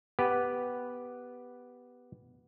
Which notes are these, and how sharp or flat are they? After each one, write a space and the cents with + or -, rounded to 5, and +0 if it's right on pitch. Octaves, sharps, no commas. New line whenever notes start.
B3 +0 G4 +0 B4 +0